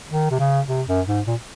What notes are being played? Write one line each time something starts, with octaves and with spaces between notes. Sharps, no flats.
D#3
C3
C#3
C3
F#2
G#2
A#2